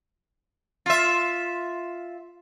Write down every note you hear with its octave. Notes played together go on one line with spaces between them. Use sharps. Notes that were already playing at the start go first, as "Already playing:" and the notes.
F4 E5